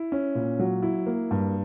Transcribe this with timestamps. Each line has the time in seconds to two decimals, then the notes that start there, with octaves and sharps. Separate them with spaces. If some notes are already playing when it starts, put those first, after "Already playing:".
Already playing: E4
0.12 C#4
0.35 A#2
0.59 F#3
0.82 E4
1.06 A#3
1.31 G2